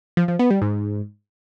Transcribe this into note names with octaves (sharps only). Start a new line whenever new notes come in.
F3
F3
B3
G3
G#2